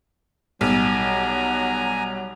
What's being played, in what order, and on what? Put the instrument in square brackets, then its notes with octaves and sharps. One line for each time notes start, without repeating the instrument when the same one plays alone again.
[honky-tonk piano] B1 [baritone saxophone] F#3 [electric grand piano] G3 [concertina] G#5 A#5